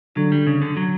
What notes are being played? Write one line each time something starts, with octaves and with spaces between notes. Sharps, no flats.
D3 F#3
G3
C#3
D3
F#3